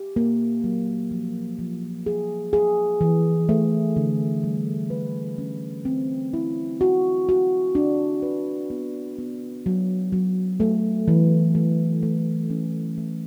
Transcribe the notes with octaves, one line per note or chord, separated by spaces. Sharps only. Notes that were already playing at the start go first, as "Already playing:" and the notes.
Already playing: G4
A#3
F#3
F3
F3
G#4
G#4
E3
A3
D3
G3
B4
C#4
C4
E4
F#4
F#4
D4
B4
B3
B3
F#3
F#3
A3
E3
A3
A3
C#4
A3